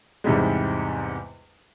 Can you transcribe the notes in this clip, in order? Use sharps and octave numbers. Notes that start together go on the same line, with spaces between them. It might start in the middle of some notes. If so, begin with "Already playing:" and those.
E2 G#2 C3 G3 G#3